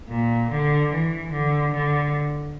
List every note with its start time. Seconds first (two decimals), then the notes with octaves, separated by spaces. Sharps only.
0.09 A#2
0.50 D3
0.91 E3
1.32 D3
1.73 D3